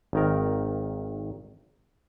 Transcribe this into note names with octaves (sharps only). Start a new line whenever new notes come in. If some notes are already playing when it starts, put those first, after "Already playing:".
G#1 D#3 A#4